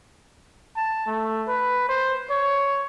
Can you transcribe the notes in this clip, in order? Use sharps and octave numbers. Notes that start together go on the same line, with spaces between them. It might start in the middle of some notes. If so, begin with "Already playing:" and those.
A5
A3
B4
C5
C#5